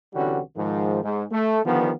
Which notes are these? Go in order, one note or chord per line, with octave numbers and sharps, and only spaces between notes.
C2 D3 E3 G3 C#4 F#4
G#2 D#3 F3
G#2
A3
D3 D#3 F3 G3 B3